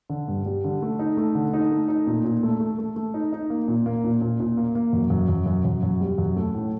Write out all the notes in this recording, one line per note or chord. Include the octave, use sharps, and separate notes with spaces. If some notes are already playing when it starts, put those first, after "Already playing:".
D3
G2
G3
D3
A3
D#4
A3
D3
D#4
A3
D#4
A#2
A#2
A3
A3
A3
A3
D#4
D#4
A#3
A#2
A#3
A#2
A#2
A#2
A#3
A#3
F#2
F#2
F#2
F#2
F#2
F#2
G3
F#2
A3
A2